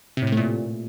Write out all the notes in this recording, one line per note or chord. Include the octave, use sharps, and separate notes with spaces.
C3
A2
C3
A3
A#2